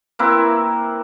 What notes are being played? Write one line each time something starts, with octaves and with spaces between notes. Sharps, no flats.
A#3 C4 E4 B4